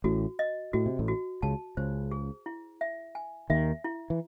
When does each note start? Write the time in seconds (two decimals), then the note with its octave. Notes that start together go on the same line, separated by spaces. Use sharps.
0.04 A1 A2 F#4
0.39 D#5
0.73 A2 F#4
0.86 C3
0.99 A1 A2
1.08 F#4
1.42 C#2 C#3 A5
1.77 C#2 C#3 C5
2.11 G#4
2.46 E4
2.81 E5
3.15 G#5
3.50 D#2 D#3 E5
3.84 E4
4.10 E3